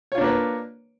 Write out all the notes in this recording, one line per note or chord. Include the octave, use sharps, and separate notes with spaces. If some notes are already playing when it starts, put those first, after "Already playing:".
A#3 D4 F4 B4 C#5